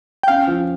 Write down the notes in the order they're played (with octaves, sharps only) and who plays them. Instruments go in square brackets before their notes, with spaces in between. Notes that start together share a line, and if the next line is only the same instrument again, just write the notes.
[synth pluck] G5
[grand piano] C#4 [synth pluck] F5
[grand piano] F3